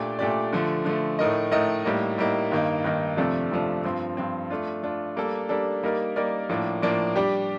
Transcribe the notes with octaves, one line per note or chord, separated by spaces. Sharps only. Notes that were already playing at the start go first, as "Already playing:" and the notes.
Already playing: A#2 A3 D4 G4 D5
A#2 A3 D4 G4 D5
D3 F3 A3
D3 F3 A3
A2 A3 D#4 A#4 D#5
A2 A3 D#4 A#4 D#5
A2 G3 A#3 D#4
A2 G3 A#3 D#4
G2 D#3 A#3 D#4
G2 D#3 A#3 D#4
F2 C3 F3 A3 D4
F2 C3 F3 A3 D4
G2 F3 C4
G2 F3 C4
A3 D4 F4
A3 D4 F4
G3 A#3 D4 A4
G3 A#3 D4 A4
G3 A#3 D#4 A#4 D5
G3 A#3 D#4 A#4 D5
A2 F3 A#3 D4
A2 F3 A#3 D4
G3 D4 G4